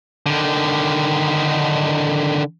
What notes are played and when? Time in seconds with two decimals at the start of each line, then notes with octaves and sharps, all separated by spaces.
0.26 D3 D#3